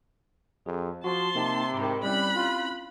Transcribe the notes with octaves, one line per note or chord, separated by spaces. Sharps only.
F2 G#4
F3 F#4 A5 C6
C3 A#3 D#4 G4
G#2 D#3 G5 B5 D6
G3 C4 C#4 E4 B5 F#6
F4